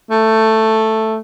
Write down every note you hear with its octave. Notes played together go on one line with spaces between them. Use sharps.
A3